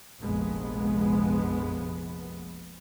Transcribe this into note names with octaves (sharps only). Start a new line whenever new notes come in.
F1 A#1 F2 G#3 B3